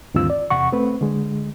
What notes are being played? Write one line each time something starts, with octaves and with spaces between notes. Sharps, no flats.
D2 G2 D#3 C4 F4 E6
D5
E2 C3 F#5 C#6
A3 C4 B4
D3 G#3